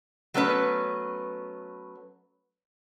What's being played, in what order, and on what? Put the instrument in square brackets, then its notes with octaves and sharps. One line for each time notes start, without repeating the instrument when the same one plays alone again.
[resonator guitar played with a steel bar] F#3 A3 B3 C#4 B4